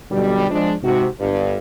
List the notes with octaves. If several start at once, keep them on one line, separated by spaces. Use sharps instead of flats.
B1 B2 D3 G3
F3 G#3 D4
G#2 C3 F#4
G1 G2